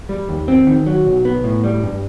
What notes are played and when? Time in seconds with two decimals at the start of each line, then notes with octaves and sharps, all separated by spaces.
0.09 G3
0.29 D#2
0.48 C4
0.67 D#3
0.86 F#3
1.06 B1
1.25 B3
1.44 A2
1.64 G3
1.83 G2